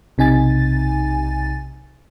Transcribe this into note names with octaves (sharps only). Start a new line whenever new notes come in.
B1 C3 D#4 G#5 A6